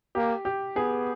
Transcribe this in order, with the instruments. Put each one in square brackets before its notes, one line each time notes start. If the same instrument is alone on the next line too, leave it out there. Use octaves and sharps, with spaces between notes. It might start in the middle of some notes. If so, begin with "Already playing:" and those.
[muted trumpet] A#3 [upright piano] G4
[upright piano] G4
[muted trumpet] B3 [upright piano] G#4